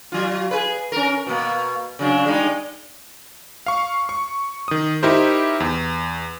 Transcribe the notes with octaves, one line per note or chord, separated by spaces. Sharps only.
F#3 F4
G#4 B4
C#4 A#4
B2 A#3
C#3 F#3 D4
G3 G#3 D#4
F5 C#6
C#6
D#3 D#6
D#4 E4 G4 A#4 C5
E2